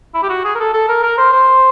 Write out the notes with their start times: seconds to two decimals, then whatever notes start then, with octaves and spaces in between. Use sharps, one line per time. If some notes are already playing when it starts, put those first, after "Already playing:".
0.14 E4
0.23 G4
0.29 F#4
0.45 G#4
0.55 A#4
0.59 A4
0.73 A4
0.89 A#4
1.03 A#4
1.18 C5
1.32 C5